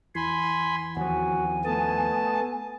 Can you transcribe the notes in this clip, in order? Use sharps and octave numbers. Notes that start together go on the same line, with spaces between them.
E2 E3 G#5 B5 C6
D#2 F3 F#4 G#5
A3 B3 A5 D#6